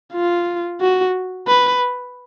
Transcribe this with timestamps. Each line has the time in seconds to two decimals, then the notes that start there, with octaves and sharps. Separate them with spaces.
0.14 F4
0.81 F#4
1.48 B4